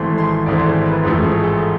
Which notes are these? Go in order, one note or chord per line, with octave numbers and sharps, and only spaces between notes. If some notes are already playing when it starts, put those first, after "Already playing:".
Already playing: G#1 G#2 E3 A3 C4 C6
C6
G#1 G#2 E3 A3 C4 D5
C5
B4
A1 G#2 F3 A3 A4
G#4
A4